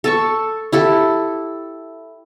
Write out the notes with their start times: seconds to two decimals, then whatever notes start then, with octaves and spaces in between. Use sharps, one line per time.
0.04 A4 A5 C#6
0.72 E4 G4 A4